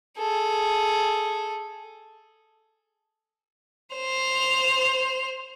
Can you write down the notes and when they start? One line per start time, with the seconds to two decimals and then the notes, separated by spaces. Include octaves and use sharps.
0.18 G#4 A4
3.96 C5 F7